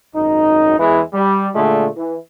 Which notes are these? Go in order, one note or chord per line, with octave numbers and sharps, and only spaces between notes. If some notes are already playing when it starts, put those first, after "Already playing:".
G#1 F#2 D#4
E2 E3 G#3 E4
G3
A#2 D3 G#3 A3
E3